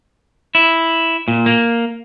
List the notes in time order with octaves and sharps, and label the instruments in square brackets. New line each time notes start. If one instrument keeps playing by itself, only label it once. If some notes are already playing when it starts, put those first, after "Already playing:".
[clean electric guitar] E4
A#2
A#3